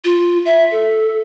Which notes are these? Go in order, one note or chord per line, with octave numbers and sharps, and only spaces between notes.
F4
E5
A4